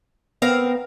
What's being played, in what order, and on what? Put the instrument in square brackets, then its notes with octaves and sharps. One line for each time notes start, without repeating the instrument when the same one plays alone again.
[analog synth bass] B3 [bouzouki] C4 A#4 F5